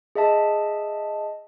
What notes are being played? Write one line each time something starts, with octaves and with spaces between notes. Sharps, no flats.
G#4 D#5 E5 A5